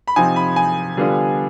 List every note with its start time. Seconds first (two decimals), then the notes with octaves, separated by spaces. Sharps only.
0.08 B5
0.16 C3 F3 C4 D#4 G#5
0.36 B5
0.56 G#5
0.97 D3 G3 B3 D4 F4